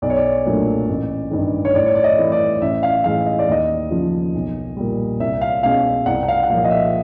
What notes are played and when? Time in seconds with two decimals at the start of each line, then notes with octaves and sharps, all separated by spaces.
0.02 B1 D5
0.10 C#5
0.17 D5
0.45 A#2 F#3 A3 D4
0.89 A1
1.31 G2 D#3
1.65 C#5
1.75 A2 D5
1.86 C#5
1.95 D5
2.04 D#5
2.18 E3 A3 C4 E4
2.32 D5
2.61 A1 E5
2.83 F5
3.04 A2 E3 G#3 F5
3.26 D#5
3.39 D5
3.48 D#2 D#5
3.91 C#3 F3
4.34 B1
4.77 A#2 G3
5.20 C2 E5
5.41 F5
5.63 B2 G#3 C#4 F5
6.06 C2 F#5
6.23 F#5
6.28 F5
6.43 F#5
6.50 A#2 F3 F5
6.64 D#5
6.71 E5